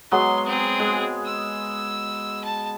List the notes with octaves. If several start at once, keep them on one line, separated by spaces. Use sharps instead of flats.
F#3 G#3 B3 C6
C4 G#4
G#3
E6
A5